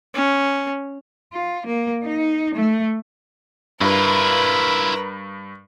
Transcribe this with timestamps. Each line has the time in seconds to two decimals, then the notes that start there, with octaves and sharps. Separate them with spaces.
0.14 C#4
1.33 F4
1.66 A#3
2.04 D#4
2.54 A3
3.81 G2 E4 F4 A#4 B4